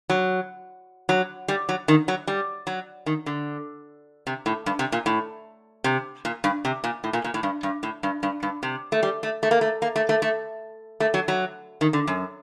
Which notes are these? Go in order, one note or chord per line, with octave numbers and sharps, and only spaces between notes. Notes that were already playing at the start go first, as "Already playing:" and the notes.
F#3
F#3
G3
F#3
D#3
F#3
G3
F#3
D#3
D3
C3
A2
G2
C3
A#2
A2
C3
A#2
G2
C3
A#2
A2
A#2
A#2
A2
G2
G2
A2
G2
G2
G2
C3
A3
G3
A3
A3
A#3
A3
A#3
A3
A3
A3
A3
F#3
F#3
D#3
D3
F#2